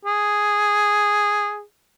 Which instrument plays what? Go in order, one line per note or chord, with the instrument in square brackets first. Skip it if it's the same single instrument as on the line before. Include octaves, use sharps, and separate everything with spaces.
[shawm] G#4